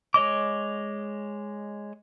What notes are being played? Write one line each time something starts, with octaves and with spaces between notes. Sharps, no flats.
G#3 C#5 D#5 D6